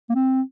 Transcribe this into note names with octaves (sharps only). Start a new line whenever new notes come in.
A#3
C4